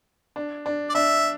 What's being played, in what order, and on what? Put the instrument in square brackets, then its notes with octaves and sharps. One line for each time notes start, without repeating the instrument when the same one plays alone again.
[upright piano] D4
D4
[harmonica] D5
[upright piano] D4 [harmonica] E5